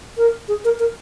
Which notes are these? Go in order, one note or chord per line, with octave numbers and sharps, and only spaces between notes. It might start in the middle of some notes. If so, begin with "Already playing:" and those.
A#4
G#4
A#4
A#4